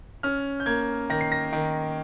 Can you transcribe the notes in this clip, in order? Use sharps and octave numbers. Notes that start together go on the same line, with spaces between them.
C#4 F6
G6
A#3 G#6
D#3 A#6
C7
A#6
D#3